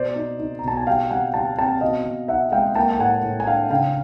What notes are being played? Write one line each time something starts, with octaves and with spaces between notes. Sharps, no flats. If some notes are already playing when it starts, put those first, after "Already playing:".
Already playing: B2 C5 D5
D#4
D#4
A#5
B2 A5
G#5
G3 F5 G5
G3 F#5 G#5
G3 G5 A5
C4 G5 A5
B2 D#5 F5
B2
D#4 E5 F#5
G#3 F5 G5
A#3 G5 A5
G5
A2 F#5 G#5
A2
G#5
D4 F5 G5
C#3 F5 G5